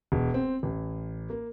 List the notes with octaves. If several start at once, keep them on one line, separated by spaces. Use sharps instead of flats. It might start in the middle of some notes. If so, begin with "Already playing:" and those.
E1
C4
A1
A#3